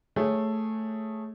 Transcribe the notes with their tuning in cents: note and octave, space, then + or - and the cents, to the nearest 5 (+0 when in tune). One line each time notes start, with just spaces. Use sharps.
A3 +0 G#4 +0 C#5 -10